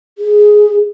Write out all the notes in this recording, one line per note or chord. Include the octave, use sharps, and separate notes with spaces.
G#4